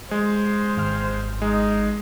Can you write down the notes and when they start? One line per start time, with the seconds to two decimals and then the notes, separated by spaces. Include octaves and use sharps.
0.11 G#3 C5
0.77 G#1 F6
1.42 G#3 D#4